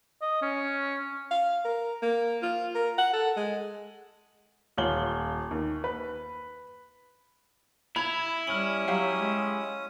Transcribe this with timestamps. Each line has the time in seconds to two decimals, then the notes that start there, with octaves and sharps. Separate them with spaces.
0.22 D#5
0.42 C#4
1.31 F5
1.65 A#4
2.03 A#3
2.42 F4
2.75 A#4
2.98 F#5
3.13 A4
3.37 G#3
4.78 D#1 F4 C#5 F#7 G7
5.51 D#2
5.84 B4
7.96 E4 B5 G#6 F7
8.47 G3 C#4 D#6 F6 F#7
8.88 F#3 G4 F5
9.14 G#3